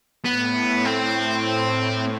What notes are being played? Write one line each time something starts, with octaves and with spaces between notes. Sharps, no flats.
A2 B3
C4